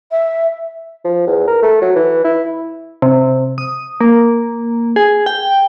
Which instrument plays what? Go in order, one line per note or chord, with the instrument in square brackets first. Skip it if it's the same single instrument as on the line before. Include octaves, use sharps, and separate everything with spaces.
[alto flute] E5
[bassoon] F3
E2
A#4
A3
F#3
E3
E4
[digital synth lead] C3
D#6
A#3
G#4
G5